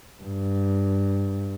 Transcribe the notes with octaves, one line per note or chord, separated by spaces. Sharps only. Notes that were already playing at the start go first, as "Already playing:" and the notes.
G2